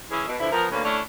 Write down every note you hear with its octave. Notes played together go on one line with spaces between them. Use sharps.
E3 C#4 E4 G#4
B2
D3 E3 F3 E4
F3 B3 A#4
D2 D3 A#3 C#4 B4
A3 C#4 D4 E4 C#5